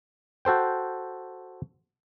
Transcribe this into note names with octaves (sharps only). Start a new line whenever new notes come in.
F#4 A4 C5 G5